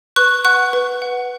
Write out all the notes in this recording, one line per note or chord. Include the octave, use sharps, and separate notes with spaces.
B4 C#6 F#6
F#5 C#6 F#6
B4
F#5